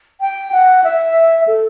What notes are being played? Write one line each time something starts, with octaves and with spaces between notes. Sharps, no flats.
G5
F#5
E5
A4